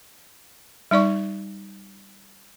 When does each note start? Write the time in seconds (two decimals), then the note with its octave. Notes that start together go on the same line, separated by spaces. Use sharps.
0.91 G3 D#4 D5 C#6